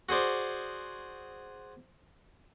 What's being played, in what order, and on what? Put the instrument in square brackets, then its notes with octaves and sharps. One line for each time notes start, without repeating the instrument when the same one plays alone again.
[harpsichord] F#4 G#4 C5 D5